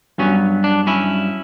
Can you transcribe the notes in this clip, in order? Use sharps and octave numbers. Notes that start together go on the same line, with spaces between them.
G2 F#3 B3 C#4
D4
C#4 E4